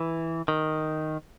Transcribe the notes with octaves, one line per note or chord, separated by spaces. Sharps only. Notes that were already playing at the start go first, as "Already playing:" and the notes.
Already playing: E3
D#3